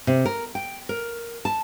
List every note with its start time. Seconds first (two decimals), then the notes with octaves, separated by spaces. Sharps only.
0.07 C3
0.25 A#4
0.55 G5
0.89 A#4
1.45 A5